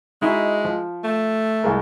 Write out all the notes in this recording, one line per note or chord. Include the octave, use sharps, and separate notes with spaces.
G#3 D#4 E4 F#4
F3
A3
C2 G#3 A#4